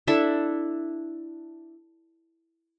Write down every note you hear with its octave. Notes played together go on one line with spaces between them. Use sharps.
D4 E4 A4 E5